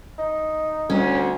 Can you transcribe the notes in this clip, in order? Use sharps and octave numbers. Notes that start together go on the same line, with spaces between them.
D#4
D2 G3 C#4